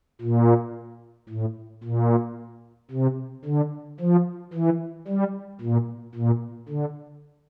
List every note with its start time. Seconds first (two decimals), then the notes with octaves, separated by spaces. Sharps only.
0.21 A#2
1.29 A2
1.84 A#2
2.91 C3
3.45 D3
4.00 F3
4.54 E3
5.08 G3
5.61 A#2
6.15 A#2
6.69 D3